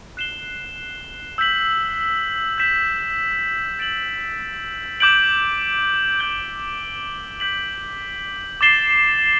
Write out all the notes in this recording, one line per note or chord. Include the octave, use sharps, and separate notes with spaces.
F#6 C7 E7 G7
E6 G6 B6 F#7
G6 B6 E7
A6 D7 F#7
D6 G6 D7 F#7
G6 D7 G7
G6 B6 F#7
D6 A6 C7 E7 G7